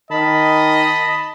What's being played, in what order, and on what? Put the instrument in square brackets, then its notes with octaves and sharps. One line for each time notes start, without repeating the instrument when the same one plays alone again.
[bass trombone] D#3 [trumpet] D#5 [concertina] A5 B5